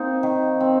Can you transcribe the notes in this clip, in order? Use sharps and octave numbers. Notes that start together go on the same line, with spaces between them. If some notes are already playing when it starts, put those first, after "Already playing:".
Already playing: A#3 C4 D#4
D#3
C4